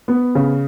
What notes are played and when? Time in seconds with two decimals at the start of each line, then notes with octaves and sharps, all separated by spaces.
0.08 B3
0.35 C#3